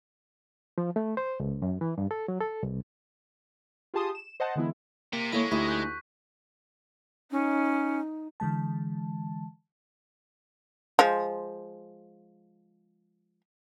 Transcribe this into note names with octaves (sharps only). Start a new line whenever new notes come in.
F3
A3
C5
C#2
F#2
E3
G2
A4
F#3
A4
C2
F4 G4 G#4 A5 C6 D#6
E7
C5 D#5 F#5 A5
D3 E3 G#3 B3 E4
C3 A#3 B6
D#2 G#3 A#3 E4 A4 C#5 C#6 D#7
D2 A3 D#4 E4 G4 E5 C#6 B6
F#6 G6
C#4 D#4
D3 E3 G#3 A5
F3 G#3